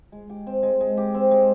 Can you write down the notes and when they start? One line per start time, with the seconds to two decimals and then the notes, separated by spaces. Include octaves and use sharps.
0.12 G#3
0.30 G4
0.47 C4
0.63 G#3
0.81 G#3
0.97 G4
1.14 C4
1.31 G#3